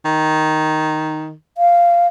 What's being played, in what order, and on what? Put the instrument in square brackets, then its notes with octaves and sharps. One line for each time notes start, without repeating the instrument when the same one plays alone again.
[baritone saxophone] D#3
[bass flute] F5